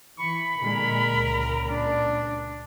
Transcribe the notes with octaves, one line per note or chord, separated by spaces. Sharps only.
E3 B5 C#6
A#2 D3 G#3 A#4
C#2 A#2
D4